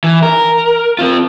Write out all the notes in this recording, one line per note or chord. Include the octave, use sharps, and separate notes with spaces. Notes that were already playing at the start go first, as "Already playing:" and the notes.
E3
A#4
C4 F4